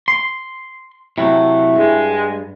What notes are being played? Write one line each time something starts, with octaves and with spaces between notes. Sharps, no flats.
C6
C3 F#3 A3 E4
G2 G#3